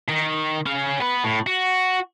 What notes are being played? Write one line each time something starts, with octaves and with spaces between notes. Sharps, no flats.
D#3
C#4 F5
B3 B4
A2
F#4